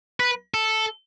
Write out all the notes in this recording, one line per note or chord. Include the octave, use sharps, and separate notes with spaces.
B4
A4